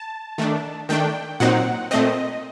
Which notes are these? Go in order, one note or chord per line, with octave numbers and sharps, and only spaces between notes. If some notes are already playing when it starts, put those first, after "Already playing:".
Already playing: A5
D#3 A3 D4
D#3 A3 D4 G5
A#2 F#3 C4 D#4 F#5
A#2 A3 C4 D#5